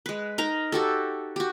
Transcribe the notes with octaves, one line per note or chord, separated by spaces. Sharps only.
G#3 B4
D#4 A#4 A#5
F#4 G4 A4
F#4 G4